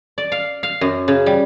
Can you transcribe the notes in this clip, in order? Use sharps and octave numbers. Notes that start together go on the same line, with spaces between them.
D5
F5
F5
F#2
C#3
G3